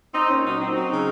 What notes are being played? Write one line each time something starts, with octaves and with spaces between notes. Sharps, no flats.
C4 D#4
A#2 C#4
F#3 D#4
C4 D#4
F#3
C#3